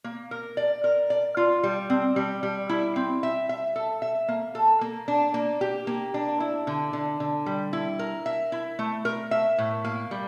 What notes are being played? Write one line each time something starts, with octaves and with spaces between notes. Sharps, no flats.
A#3
A#4
D5
A#4
D5
F4
G3
C4
G3
G3
E4
C4
E5
E5
A4
E5
A#3
A4
A#3
D4
A#3
G4
A#3
D4
E4
D3
D3
D3
G3
E4
A#4
E5
E4
A3
A#4
E5
A2
A#3
G3